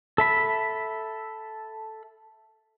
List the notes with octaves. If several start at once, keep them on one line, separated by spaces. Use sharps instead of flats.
A4 E5 B5